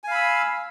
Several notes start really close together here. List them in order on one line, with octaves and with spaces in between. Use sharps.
G#5 F5 B5 E6